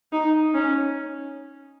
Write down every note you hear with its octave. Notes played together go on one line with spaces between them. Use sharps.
D#4
C#4